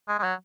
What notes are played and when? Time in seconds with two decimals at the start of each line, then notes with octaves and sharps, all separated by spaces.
0.08 G#3
0.19 G#3
0.23 F#3